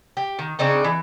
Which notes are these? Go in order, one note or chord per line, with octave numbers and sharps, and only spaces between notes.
G4
D#3
C#3 C4 D4 D#4
E3